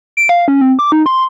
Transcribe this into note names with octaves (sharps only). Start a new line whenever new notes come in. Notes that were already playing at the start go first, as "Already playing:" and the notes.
D7
F5
C#4
C4
D6
D#4
C6